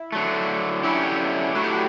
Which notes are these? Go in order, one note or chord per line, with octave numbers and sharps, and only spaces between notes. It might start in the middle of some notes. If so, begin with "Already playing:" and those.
Already playing: E4
D3 F#3 A3
D3 F#3 C#4 E4 G4
A2 F#3 A3 E4 F#4
G4
F#4